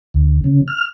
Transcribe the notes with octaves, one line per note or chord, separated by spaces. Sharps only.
D2
C#3
F6